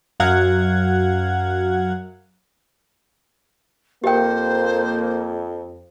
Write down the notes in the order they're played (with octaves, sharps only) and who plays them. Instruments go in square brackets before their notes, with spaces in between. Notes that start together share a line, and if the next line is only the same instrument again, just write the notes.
[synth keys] F#2 F#3 F5 F#5 G#6
[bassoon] F2 [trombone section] A#3 [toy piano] G4 G5 [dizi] C5